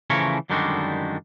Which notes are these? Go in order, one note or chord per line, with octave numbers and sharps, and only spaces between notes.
C#3 E3 F3 A3 A#4 C#5
F#2 D3 D#3 G3 G#3 F#4